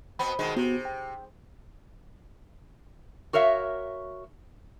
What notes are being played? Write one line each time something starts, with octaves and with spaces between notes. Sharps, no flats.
B2 B3 C4 B5
B2 D#3 G#3
C3 B3 F#4
G5
F#4 A#4 C#5 E5 F5